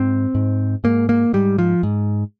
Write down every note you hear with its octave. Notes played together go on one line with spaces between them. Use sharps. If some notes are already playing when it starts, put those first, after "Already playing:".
Already playing: G#2 C4
G#2
G#2 A#3
A#3
G#2 G3
F3
G#2